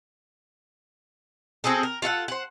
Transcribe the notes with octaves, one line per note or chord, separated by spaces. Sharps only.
C4 F#4 G#4 A4
A#4
F4 A4 F5 F#5
C5 F#5